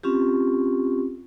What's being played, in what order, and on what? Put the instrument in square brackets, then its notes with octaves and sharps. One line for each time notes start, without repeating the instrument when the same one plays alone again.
[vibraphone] C4 C#4 F4 G4